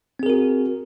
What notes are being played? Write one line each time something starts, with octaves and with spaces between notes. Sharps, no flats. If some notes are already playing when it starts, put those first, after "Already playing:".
C4 F#4 G#4 A#4